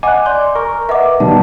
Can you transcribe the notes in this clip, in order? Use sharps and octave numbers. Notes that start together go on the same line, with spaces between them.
D#5 F#5 G#5 D6 F#6
D5 C6 D6 G6
A#4 C#6
B4 D#5 E5 F#5 D6
B2 D#3 G3 D#4 A5